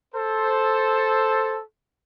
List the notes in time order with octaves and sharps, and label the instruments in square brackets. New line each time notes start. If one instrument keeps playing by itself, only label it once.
[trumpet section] A4 C5